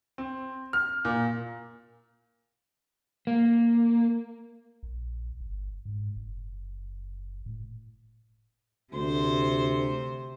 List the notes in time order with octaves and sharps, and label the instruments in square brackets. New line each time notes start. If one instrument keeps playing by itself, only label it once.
[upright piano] C4
F6
A#2
[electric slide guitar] A#3
[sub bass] A#1
G1
G#2
F#1
A2
[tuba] D2 [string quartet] C3 C5